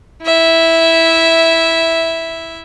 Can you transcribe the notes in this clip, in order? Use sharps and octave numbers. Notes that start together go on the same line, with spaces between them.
E4 E5